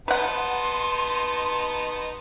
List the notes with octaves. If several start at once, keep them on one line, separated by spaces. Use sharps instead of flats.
B3 D#4 B4 F#5 A5 C6